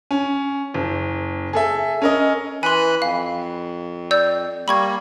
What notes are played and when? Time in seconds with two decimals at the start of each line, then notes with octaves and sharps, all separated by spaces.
0.11 C#4
0.74 F#1
1.53 G#4 A4 E5
2.02 C#4 A#4 D#5
2.63 E3 G#5 B5 C6 F#6
3.02 F2 F5
4.11 D5 E6 G6
4.68 G3 A#3 B5 C#6 G#6